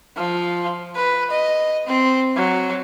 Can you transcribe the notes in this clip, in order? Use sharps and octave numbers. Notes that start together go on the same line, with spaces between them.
F3
B4
D#5
C4
F#3